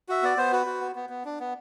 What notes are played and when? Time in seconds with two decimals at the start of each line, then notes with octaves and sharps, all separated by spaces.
0.09 F#4 E5
0.23 B3 D5
0.37 B3 C5
0.52 F#4 B4
0.66 F#4
0.80 B3
0.95 B3
1.10 B3
1.25 D4
1.40 B3